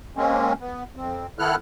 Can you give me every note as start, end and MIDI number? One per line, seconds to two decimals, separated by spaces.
0.17 0.53 56
0.17 0.53 58
0.17 0.53 60
0.17 0.53 61
0.60 0.83 59
0.96 1.27 41
0.96 1.27 60
1.39 1.55 51
1.39 1.55 59
1.39 1.55 64
1.39 1.55 69
1.39 1.55 89
1.39 1.55 90